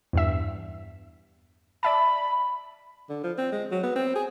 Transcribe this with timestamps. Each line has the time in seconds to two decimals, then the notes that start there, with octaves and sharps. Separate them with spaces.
0.13 E2 G2 E5
1.83 D5 E5 A5 B5
3.09 D3
3.23 F3
3.38 C4
3.52 G#3
3.71 F#3
3.83 B3
3.96 C4
4.15 G#4